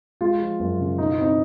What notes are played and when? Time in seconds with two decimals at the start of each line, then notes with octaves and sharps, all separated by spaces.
0.21 G#3 F4
0.40 F3
0.60 F#2
0.79 C#3
0.98 B2 D#4
1.10 E4
1.18 C4 D#4